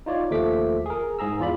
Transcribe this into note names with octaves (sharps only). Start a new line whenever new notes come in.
D#4 F4 C#5 D5
D#2 F3 A3 D6 B6
G#4 A#4
G#2 G#4 A#5 E6
E2 F4 D5 B5